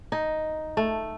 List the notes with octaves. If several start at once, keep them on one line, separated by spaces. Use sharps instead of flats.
D#4
A3